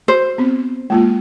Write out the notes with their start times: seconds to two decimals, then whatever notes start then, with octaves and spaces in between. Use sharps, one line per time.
0.08 F#4 C5
0.38 B3 C4
0.90 G#3 A#3 F4